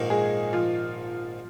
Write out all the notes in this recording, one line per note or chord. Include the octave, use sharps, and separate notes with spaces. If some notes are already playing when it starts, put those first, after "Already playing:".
Already playing: A#1 G#2 D#3 A#3 D#4
G#3 G#4
F3 F4